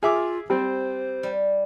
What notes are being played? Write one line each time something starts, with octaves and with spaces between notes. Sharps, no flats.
F4 G#4 E5 F5 D6
G3 C4 C5
G3